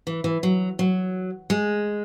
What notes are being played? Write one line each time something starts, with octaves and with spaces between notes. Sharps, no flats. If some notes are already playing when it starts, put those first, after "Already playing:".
E3
E3
F#3
F#3
G#3